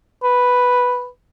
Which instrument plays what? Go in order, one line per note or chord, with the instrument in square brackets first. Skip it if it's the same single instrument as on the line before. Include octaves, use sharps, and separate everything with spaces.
[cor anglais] B4